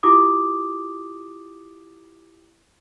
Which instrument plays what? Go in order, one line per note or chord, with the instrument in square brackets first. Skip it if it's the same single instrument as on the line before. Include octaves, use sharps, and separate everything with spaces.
[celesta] E4 F4 G4 D6 D#6